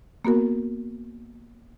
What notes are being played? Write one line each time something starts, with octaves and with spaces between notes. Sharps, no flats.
A#3 B3 F#4 A#4